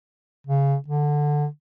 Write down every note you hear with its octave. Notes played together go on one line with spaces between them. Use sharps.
C#3
D3